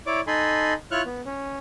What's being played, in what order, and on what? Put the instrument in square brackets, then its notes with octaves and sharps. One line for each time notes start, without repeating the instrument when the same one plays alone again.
[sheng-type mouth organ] E4 C#5 D5 D6
D#4 A4 G#5 B5 C6
E4 F4 C#5 C#6 F6 F#6
B3
C#4